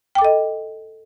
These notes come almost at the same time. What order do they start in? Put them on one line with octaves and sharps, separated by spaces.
G5 D6 A4 D#5